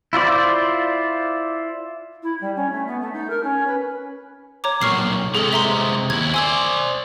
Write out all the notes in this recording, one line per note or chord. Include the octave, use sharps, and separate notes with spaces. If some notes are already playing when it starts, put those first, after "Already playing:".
E4 F4 C5 D5
E4
G3
C#4
A3
B3
A3
D#4
A#4
C#4
B4
C#5 A#5 D6
B1 A#2 C#6 F6 C7
C3 G#3 G#4 A4
E5 A#5 C6
D#2 E4 G#6
C5 D5 G#5 E6 G#6